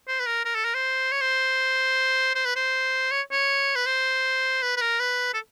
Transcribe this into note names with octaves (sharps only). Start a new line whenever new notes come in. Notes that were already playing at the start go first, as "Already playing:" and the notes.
C5
B4
A#4
A#4
A4
A#4
C5
C#5
C5
C5
B4
C5
C#5
C#5
B4
C5
B4
B4
A#4
B4
A4